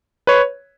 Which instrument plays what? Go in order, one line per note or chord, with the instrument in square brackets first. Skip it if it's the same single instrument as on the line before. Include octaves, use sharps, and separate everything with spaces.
[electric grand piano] B4 C#5